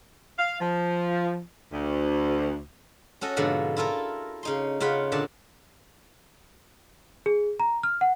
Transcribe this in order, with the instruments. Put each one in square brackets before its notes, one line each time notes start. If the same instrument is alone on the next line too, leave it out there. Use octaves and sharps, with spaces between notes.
[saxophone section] F5
F3
D2
[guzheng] C#4 F#4 A4 D#5
G#2 B2 D3 F3
E4 F4 A4 A#4
C#3 D#4 C6
C#3 F4 F#5 B5
A#2 D3 A5
[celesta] G#4
A#5
F6
F#5